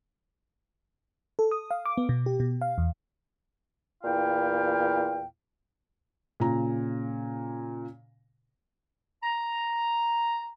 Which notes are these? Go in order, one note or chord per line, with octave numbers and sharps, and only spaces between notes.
A4
D#6
F5
D6
B3
B2
G4
B2
F5
E2
E2 A#2 E4 F5 G5
A#2 C#3 A#5
A#5